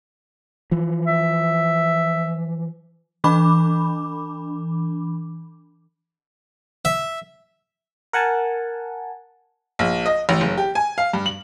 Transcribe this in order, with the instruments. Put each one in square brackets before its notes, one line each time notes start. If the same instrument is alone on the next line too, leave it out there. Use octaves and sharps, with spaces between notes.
[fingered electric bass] E3 F3
[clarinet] E5
[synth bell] E3 D4 B5 D6
[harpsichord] E5
[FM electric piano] A#4 F#5 G#5 A5
[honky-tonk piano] A#1
D#5
A1
F#1
G4
G#5
F5
G2
F#7